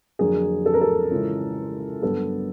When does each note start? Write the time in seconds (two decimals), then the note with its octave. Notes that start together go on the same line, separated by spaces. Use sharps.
0.19 F2 D3 F#3 A#3 G#4
0.66 A4
0.74 A#4
0.81 A4
1.10 C#3 E3 G#3 C#4 F4
2.02 G2 D3 F#3 B3 D4 A4